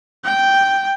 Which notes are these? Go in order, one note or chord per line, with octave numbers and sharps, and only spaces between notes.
G5